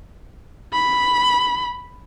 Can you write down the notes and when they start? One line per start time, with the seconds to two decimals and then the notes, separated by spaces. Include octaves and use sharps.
0.73 B5